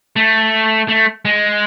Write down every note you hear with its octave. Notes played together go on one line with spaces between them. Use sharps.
A3
A3
G#3